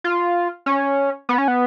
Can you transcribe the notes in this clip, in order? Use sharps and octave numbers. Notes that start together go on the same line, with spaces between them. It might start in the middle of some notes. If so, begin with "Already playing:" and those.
F4
C#4
B3
C#4
B3